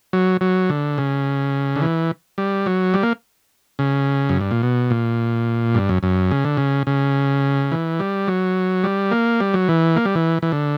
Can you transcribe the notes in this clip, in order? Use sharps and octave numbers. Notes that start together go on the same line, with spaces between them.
F#3
F#3
D3
C#3
D3
E3
G3
F#3
G3
A#3
C#3
F#2
G2
A#2
B2
A#2
G2
F#2
F#2
C#3
D3
C#3
C#3
E3
G3
F#3
G3
A#3
G3
F#3
E3
A#3
G3
E3
E3
D3